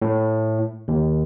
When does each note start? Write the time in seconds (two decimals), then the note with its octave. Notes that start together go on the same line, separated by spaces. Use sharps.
0.02 A2
0.88 D#2